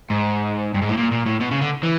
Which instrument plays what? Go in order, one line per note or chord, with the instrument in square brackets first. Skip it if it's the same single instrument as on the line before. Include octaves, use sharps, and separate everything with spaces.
[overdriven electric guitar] G#2
G2
G#2
A2
A#2
A#2
A2
B2
C#3
D3
E3